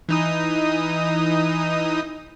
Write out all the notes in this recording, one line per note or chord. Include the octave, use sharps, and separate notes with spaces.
E3 D#4 D#6